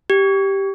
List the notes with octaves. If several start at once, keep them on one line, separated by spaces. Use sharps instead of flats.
G4